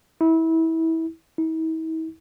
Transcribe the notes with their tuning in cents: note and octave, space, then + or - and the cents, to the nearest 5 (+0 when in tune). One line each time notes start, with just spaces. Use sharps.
E4 -25
E4 -45